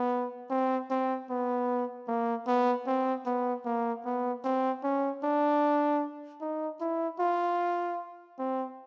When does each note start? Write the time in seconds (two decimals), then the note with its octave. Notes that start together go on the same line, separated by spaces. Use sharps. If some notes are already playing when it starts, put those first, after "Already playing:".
Already playing: B3
0.50 C4
0.90 C4
1.30 B3
2.08 A#3
2.47 B3
2.87 C4
3.26 B3
3.65 A#3
4.05 B3
4.44 C4
4.83 C#4
5.23 D4
6.41 D#4
6.81 E4
7.19 F4
8.39 C4